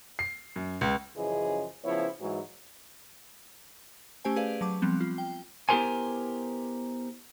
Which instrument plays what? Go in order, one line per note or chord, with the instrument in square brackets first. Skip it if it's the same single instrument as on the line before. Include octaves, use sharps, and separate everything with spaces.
[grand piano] C7
F#2
C#2
[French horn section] F#2 C#3 E3 F3 G#4 D#5
C#3 F3 B3 E4 C5 C#5
G#2 E3 F#3
[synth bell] A3 C#4 G4 C5 G#5
G#4 B4 D5 F5
F#3 A5 D6
F3 G3 B3 C4
F4
G5
[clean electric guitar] B3 E4 G4 A#4 C5 G#5